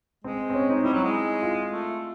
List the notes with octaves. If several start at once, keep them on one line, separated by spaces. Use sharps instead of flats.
G#3 C4
C4
C#4
D#4
G3 E4
F#3
G#3
F4
A3